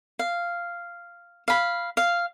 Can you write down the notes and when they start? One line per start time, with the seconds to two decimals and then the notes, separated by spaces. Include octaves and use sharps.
0.19 F5
1.48 F5 B5
1.97 F5